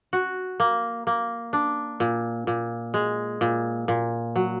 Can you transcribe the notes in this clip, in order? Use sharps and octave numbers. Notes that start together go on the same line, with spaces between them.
F#4
A#3
A#3
D4
A#2
A#2
G#3
A#2
A#2
F#3